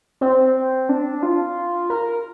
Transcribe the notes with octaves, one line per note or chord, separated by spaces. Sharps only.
C4
D4
F4
A#4